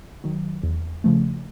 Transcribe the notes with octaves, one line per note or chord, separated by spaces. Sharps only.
D#3 F#3
E2
C#3 F3 A3